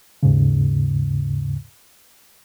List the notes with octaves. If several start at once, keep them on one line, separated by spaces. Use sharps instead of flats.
D#2 G#2 C#3